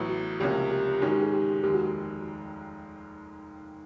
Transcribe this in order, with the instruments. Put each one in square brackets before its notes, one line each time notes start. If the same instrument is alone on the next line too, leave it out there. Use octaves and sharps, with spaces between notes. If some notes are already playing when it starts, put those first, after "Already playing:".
Already playing: [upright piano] A1 A2 F#3 B3
[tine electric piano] F#4
[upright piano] C#2 C3 F3 A#3 C#4 [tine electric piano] G4
[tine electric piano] G4
[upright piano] G#2 D#3 G#3 C#4 [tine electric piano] F#4
[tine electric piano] G4
G#4
G4
[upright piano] F1 D#2 D#3 G#3 [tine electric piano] G4
[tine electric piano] F#4